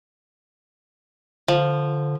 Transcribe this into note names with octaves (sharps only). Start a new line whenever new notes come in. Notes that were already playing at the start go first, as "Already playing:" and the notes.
D3 F3